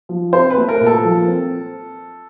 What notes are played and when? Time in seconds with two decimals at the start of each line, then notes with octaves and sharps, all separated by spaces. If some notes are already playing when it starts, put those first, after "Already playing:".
0.09 F3
0.33 C4 C5
0.50 B4
0.57 A3
0.69 A#4
0.81 A#2
0.86 A4
1.04 F3
1.28 C4